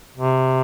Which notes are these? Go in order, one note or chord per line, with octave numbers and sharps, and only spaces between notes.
C3